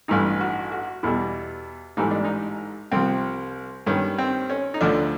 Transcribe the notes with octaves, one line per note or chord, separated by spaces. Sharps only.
A1 G2 E3 D#4
F#4
F#4
E2 B2 G3 E4
A1 G#2 E3 G3 D#4
D4
D#4
C2 C3 F3 C4
G2 D#3 G3 C#4
C4
C#4
D#4
D2 D3 F3 D4